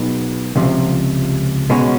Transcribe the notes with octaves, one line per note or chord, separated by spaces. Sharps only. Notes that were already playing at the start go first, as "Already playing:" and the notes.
Already playing: B2 F#3 B3 D#4 G#4
C#2 C3 F3
B2 G#3 C#4 F#4